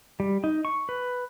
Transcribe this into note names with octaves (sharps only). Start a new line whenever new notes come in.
G3
D#4
C#6
B4